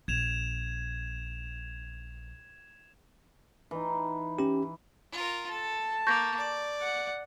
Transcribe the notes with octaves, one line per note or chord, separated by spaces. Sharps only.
A#1 G#6 E7 F7
E3 D#4
C#4 G4
F4 A#4
A4 A5
A#3 C#6 G6 A#6
D5
F#5